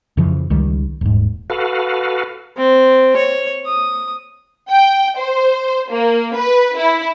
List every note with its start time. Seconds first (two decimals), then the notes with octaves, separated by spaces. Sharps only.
0.17 F2 C#3 E3 F3
0.50 C#2 D#3 G3
1.01 D#1 G#2
1.50 F#4 A4 B4 F5
2.57 C4
3.16 C#5
3.66 D#6
4.70 G5
5.18 C5
5.91 A#3
6.35 B4
6.77 E4